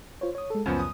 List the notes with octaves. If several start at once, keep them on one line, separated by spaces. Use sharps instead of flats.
F4 C5 C#5
C#5 D#6
G#3 A4
C#2 F#2 F3 B3
D#6